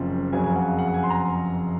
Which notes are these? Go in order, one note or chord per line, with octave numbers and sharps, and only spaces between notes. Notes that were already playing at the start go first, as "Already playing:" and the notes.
Already playing: F#1 F#2 F3 C4
F#1 F2 C#3 F#3 G#5
G#5
F#5
F5
F#5
G#5
C6
A#5